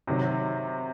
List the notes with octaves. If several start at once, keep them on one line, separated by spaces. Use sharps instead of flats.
C3 D#3 F#3